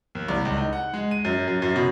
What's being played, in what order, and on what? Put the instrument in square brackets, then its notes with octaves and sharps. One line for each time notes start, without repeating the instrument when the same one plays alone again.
[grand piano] D#2
C2
C#2
D#4
F#5
G#3
D#7
F#2
F#2
F#2
B2